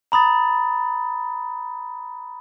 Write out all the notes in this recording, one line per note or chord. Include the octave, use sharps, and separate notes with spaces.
A#5 B5 D#6 A6